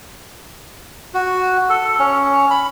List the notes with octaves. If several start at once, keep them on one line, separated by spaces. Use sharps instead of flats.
F#4
A4
C#4
B5